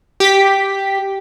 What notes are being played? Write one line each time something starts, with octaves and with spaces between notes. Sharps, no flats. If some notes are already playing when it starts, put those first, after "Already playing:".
G4 B6